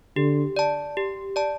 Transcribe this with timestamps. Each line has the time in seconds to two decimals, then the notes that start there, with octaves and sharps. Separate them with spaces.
0.16 D3 G4
0.56 D5 A5
0.97 G4
1.36 D5 A5